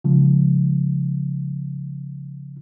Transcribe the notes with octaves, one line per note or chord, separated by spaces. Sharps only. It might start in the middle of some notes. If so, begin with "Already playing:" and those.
C#3 F3 G#3